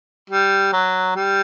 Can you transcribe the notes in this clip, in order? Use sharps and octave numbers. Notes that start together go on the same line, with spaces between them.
G3
F#3
G3